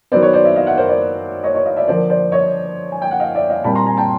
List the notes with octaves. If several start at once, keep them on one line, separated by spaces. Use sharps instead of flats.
D#3 F#3 B3 C5 D5
B4 C#5
C5 D5
D5 E5
D#5 F5
E5 F#5
A#4 C5
C5 D5
C#5 D#5
C#5 D#5
D#5 F5
D5 E5
D3 F3 A#3 C5 D5
C5 D5
C#5 D#5
G#5
G5
F#5
D#5 F5
D5 E5
D#5 F5
A#2 G3 C4 A5 B5
A#5 C6
G#5 A#5
G5 A5